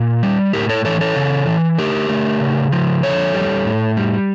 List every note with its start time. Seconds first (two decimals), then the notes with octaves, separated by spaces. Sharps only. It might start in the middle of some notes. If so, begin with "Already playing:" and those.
Already playing: A#2
0.23 G3
0.53 A2 G4 A#4
0.69 A4 C#5
0.85 E3 A4 C#5
1.01 A4 C#5
1.16 C#3
1.47 E3
1.78 A3 G4 A#4
2.09 A3
2.40 C#3
2.72 F3
3.03 D3 A4 C#5
3.34 G3
3.65 A2
3.97 G3